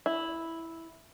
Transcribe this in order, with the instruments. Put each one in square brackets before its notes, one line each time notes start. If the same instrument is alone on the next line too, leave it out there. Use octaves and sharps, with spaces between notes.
[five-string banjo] E4